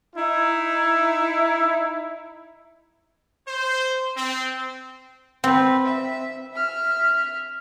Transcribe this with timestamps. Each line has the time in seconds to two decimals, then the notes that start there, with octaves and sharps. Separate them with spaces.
0.16 D#4 E4
3.47 C5
4.17 C4
5.44 C4 B4
5.85 E5
6.54 E5 F6